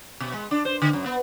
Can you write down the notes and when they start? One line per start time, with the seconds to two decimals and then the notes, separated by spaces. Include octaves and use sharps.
0.20 B2
0.33 G#3
0.51 D4
0.65 C5
0.82 D3
0.93 F#2
1.06 B3